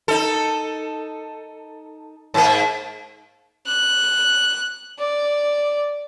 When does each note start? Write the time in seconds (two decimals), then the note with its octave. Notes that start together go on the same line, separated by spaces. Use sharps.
0.08 D#4 A4
2.34 G#2 A#3
3.67 F#6
4.99 D5